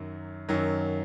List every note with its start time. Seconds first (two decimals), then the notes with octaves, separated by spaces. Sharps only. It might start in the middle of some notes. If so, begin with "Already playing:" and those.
Already playing: F#2 D#3 F#3
0.49 F#2 D#3 F#3